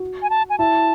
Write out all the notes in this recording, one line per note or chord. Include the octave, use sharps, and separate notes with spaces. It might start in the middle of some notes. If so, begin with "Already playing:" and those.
Already playing: F#4
G#5
A5
G#5
E4 A5